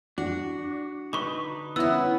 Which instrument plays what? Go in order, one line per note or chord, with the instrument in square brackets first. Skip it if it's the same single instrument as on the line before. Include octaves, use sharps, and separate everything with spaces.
[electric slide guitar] D4 [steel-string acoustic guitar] F#4
[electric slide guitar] D3 D#4 B4 [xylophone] C#6 D6
[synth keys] B3 [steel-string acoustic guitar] C#4 E4 [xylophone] E5 E6